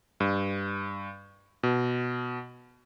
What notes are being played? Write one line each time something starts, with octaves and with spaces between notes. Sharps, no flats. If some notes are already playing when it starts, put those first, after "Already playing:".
G2
B2